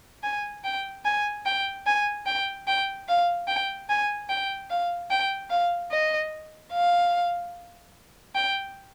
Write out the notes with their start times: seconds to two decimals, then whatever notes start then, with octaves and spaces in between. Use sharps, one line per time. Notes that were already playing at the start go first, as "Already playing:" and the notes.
0.23 G#5
0.64 G5
1.05 G#5
1.46 G5
1.86 G#5
2.26 G5
2.67 G5
3.08 F5
3.47 G5
3.89 G#5
4.29 G5
4.70 F5
5.10 G5
5.50 F5
5.91 D#5
6.72 F5
8.35 G5